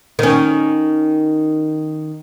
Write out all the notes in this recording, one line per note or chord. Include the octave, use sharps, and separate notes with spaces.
D#3 C#4